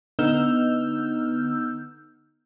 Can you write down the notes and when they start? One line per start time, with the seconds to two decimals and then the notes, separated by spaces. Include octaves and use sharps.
0.19 D3 B3 D#4 E6 F6 G6